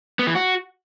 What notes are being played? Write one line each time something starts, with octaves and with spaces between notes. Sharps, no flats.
B3
E3
F#4